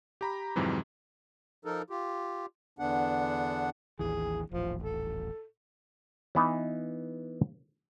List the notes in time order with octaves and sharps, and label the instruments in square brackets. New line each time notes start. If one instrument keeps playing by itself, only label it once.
[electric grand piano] G4 A#5 B5
F2 G#2 C3 E3 F#3
[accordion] F3 D#4 A4 A#4
F4 G4
E2 D3 B3 D4 F#5
[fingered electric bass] A1 D#2 E3 [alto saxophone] G#4
[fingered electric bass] D#1 A1 [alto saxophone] F3
[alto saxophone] A4
[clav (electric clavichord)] E3 B3 D#4